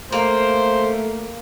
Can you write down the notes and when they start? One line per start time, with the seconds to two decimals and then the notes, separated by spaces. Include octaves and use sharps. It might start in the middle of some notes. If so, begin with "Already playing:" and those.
0.12 A3 A#3 C5